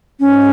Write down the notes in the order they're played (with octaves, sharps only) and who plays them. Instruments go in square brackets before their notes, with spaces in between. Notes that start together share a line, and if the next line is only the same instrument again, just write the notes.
[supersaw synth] G#2 [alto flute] C#4